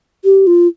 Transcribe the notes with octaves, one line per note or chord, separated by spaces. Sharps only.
G4
F4